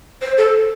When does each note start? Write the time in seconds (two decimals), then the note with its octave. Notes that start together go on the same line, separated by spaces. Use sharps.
0.22 C5
0.38 A4